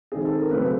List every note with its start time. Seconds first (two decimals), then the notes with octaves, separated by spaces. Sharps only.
0.12 D#3 G#3 C4 G#4
0.25 A4
0.38 A#4
0.51 C#3 F#3 A3 C4 B4